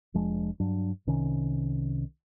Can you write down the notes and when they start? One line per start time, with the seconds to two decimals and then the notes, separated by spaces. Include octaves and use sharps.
0.14 F1 F3 G#3 D4
0.60 G2 F#3 D4
1.07 C2 C3 D#3 C#4